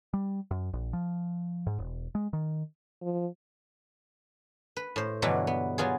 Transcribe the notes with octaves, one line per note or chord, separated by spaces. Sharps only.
G3
F#2
A#1
F3
G#2
E1
G#3
D#3
F3
B4
A2 C5
G2 B2 D3 E3 F#3
B3
F#3 B3 F4 G#4